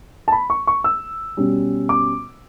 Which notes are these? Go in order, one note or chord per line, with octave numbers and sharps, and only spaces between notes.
A5
B5
C#6
C#6
E6
B2 G3 C#4
D6